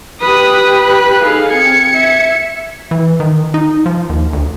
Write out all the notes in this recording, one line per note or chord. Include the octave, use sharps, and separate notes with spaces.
G4 B4 D#6 F#6
F#6
D#4 G#4 A4 F5
C4 G#6 C#7
E5
E3
D#3
D#4
F3
D#2
D2